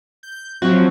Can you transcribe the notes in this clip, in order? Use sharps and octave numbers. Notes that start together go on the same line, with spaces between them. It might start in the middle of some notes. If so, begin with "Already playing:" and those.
G6
F3 F#3 C4 F#4